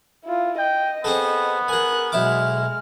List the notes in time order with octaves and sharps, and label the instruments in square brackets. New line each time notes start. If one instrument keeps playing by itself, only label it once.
[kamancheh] E4 F4
[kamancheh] D#5 [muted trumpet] G5
[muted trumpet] B3 [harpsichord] C4 G#4 A4
[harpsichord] G#4 G#5 [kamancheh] A#4 F#6
[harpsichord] B1 E4 D6 [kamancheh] G#3 F6